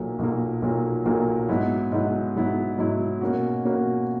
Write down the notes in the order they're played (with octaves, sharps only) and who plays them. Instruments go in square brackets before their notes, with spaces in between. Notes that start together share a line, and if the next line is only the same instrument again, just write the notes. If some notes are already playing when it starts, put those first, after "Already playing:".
Already playing: [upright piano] B1 A#2 F#3 A#3
B1 A#2 F#3 A#3
B1 A#2 F#3 A#3
B1 A#2 F#3 A#3
G#2 F#3 B3 E4
G#2 F#3 B3 E4
G#2 F#3 B3 E4
G#2 F#3 B3 E4
B2 A#3 C#4 F#4
B2 A#3 C#4 F#4